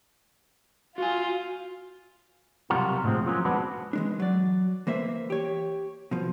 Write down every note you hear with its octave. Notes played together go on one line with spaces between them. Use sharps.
F4 F#4 G#5
B1 C3 G3 F4 F#4 A#4
A2 D3 F3 G#3 C4
F3 F#3 A#3 C#4
G#3 B3 C4 D4 F#4 B4
E3 G#3 D4
F#3 D5
E3 A#3 C5 E5
G4 C#5
B2 F3